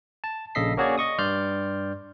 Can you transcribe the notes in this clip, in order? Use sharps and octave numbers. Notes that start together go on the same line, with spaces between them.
A5
A#1 C#3 A4 D#5 B6 C7
A#3 C#4 F#4 G#4 C#5 D5
D#5 C#6 D#6
G2 D5 C6 F6 G6